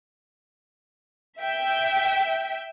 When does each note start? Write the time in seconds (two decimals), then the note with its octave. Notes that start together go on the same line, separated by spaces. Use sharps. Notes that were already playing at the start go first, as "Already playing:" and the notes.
1.40 E5 G5